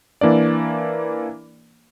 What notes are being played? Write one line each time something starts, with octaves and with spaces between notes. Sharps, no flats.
E3 A#3 D4 D5